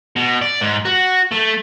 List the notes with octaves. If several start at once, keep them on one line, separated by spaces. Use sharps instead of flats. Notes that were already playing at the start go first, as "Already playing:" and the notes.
B2
D5
G#2
F#4
A3